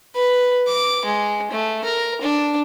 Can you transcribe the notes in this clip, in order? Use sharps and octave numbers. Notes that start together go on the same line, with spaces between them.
B4
D6
G#3
A3
A#4
D4